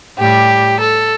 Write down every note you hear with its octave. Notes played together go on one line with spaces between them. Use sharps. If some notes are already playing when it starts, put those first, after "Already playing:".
A2 G3 G4
A4